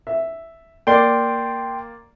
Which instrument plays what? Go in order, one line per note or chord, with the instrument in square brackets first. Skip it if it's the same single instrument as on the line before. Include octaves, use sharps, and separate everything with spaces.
[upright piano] E5
[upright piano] A#3 D5 [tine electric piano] G5 C6